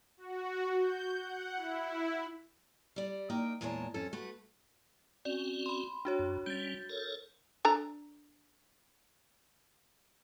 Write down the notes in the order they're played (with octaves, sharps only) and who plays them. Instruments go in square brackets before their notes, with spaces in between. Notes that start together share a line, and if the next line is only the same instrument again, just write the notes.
[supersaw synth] F#4
G6
F#5
E4
[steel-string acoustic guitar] G3 D5
A#3 D#4 G5
E2 A#2 G#3 A#4 C#5 A5
F2 C#4 A4
A3 F#4 B4
[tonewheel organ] C4 C#4 F#4 [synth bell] D5
[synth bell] B5 C6
D4 F#4 C#5
[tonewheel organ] F#2
[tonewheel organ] G3 C#4 [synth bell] G6 A6
[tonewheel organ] A4 A#4 C#5
[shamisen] D4 A4 A#5